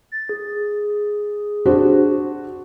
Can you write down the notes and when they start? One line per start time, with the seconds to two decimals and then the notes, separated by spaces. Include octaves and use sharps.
0.12 A6
0.29 G#4
1.65 D4 F#4 C5